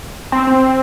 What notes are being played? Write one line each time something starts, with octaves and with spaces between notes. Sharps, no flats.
C4
C4